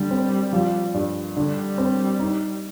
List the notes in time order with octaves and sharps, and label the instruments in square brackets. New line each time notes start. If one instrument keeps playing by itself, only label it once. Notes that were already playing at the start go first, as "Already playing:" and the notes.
Already playing: [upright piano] D3 [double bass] G3
[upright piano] C4
F3
G2
[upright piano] D3 [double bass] G3
[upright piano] C4
D#4